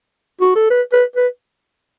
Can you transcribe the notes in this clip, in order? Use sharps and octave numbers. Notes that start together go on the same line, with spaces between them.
F#4
A4
B4
B4
B4